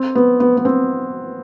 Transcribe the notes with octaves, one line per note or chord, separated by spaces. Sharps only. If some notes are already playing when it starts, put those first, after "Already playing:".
Already playing: C4
B3
B3
B3
C4